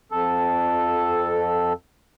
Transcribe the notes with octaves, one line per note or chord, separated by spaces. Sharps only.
F2 A4